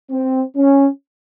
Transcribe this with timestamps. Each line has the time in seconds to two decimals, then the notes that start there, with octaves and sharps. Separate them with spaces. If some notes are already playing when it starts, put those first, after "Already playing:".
0.11 C4
0.55 C#4